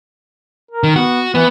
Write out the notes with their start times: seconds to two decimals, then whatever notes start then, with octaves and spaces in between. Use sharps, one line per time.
0.71 A#4
0.83 D#3
0.96 B3 F#4
1.35 E3 B3